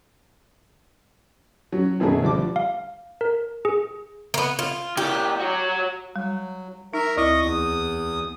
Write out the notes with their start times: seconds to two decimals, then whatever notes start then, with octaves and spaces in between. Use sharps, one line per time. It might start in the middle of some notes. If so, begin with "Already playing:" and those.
1.72 F#3 C#4
2.00 F#2 B2 D#3 A3 G#4
2.22 D2 F3 G3 D6
2.56 F5
3.21 A#4
3.65 G#4
4.34 A#3 B3
4.59 F4
4.97 A#3 E4 G4
5.40 F#4 C#5
6.16 F#3 G3
6.94 D#4 A#4 E5 A#5
7.17 D2 E4 D#5 C#6 D#6
7.42 E2 D#6